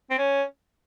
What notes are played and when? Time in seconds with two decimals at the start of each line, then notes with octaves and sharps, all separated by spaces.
0.10 C4
0.18 C#4